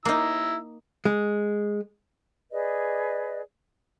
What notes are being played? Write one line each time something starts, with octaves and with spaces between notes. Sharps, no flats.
A#3 D#4 E4 A#5 E6
G#3
G#4 B4 D5 D#5